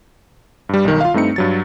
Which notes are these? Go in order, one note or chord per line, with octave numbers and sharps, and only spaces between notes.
G2 G3
B1 D#3
F4 F5
G2 A3 C4 D#4 C#7
G2 F#3 A6